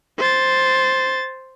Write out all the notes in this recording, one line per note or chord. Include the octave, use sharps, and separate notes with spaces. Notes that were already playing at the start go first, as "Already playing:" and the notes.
C5 A6